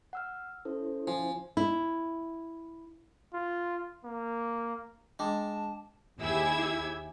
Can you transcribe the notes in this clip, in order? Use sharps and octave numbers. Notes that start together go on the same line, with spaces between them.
F#5 E6 F6
C#4 E4 A4 C5
F3 G#5
E4
F4
A#3
G#3 D4 G5 A5 D6
D#2 E4 G4 G#4 E6 G#6